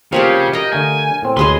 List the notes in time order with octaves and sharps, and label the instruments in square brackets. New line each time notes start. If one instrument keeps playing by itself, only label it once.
[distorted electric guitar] C#3 [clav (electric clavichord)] F3 A#3 C4 [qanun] G4 C#5 F5
[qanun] A#4 G5 [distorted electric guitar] D#5
[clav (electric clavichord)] D3 A3 [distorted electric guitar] G#5
[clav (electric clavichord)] A2 C4
[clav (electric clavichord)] D2 C#3 [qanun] G#3 G#4 B4 [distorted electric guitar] C6